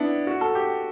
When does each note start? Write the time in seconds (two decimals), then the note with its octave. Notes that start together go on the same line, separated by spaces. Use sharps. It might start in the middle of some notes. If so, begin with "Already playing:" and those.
Already playing: B3 D4 E4
0.27 F#4
0.41 A4
0.55 G4